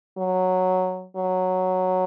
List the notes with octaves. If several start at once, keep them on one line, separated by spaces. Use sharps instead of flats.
F#3
F#3